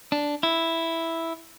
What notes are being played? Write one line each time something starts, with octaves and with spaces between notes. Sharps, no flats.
D4
E4